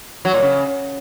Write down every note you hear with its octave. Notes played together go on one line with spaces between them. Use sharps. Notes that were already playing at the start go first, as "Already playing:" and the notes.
F#3
A#2
C#3